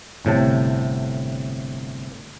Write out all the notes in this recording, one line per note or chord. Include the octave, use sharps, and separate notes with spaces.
G1 A2 C3 A5